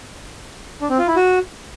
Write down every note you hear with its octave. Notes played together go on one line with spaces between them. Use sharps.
D4
C4
F4
E4
F#4